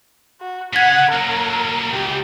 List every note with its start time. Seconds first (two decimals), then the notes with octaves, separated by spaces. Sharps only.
0.41 F#4
0.73 C#3 C#4 F#5 G#6 B6
1.13 F#3 A#3 A#4
1.93 C#2 G4